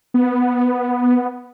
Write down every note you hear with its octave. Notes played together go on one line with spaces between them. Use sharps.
B3